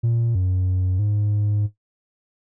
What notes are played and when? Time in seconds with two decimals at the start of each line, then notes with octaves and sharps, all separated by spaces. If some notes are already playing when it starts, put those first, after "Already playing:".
0.03 A#2
0.35 F#2
0.99 G#2